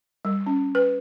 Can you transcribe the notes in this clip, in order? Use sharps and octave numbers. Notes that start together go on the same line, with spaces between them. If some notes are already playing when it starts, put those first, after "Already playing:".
G3
C#4
B4